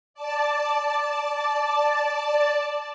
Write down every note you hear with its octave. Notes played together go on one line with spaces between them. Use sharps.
D5 A5